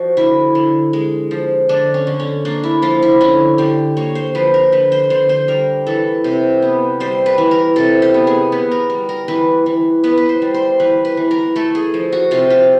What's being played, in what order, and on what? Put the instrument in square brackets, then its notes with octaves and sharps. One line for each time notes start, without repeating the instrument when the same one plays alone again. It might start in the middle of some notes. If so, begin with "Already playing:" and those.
Already playing: [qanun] F3 F#4
D3 E4
D3
G#3
F3
D3 D4
C#4
D3
C#4
A#3 D4
E4
F3 F4
E4
D3 C#4
D3 G4
A#3 C#5
C5
F3 B4
A#4
D3 B4
C5
D3 C5
C5
G3 A#4
E3 A4
C3
B3
G3 C5
B4
E3
A#4
C3 A4
G4
B3
G#4
B3
A#4
G3
A#4
E3 B4
E3
B3 B4
B4
C5
G3
C5
E3 B4
B4
E3
A#4
A3 A4
G#4
F3
F#4
C3 F4
F4